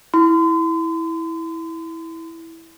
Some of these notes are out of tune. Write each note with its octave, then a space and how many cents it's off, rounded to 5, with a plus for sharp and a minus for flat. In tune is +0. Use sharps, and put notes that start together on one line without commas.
E4 -10 C6 -40